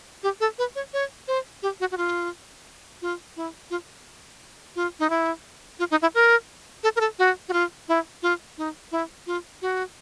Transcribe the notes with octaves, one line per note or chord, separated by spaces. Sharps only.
G4
A4
B4
C#5
C#5
C5
G4
F#4
F#4
F4
F4
E4
F4
F4
D#4
E4
F4
D#4
E4
A#4
A4
A#4
A4
F#4
F#4
F4
E4
F4
D#4
E4
F4
F#4